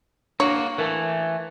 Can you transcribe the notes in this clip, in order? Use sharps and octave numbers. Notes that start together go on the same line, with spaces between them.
A#3 D4 F#4 C#5
E3 A3 A#4 A5